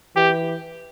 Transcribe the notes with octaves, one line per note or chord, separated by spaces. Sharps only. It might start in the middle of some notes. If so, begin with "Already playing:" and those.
E3 G4